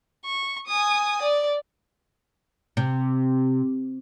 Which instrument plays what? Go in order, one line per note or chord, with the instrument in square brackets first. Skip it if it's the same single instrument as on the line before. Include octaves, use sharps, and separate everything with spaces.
[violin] C#6
G#5 D#6
D5
[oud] C3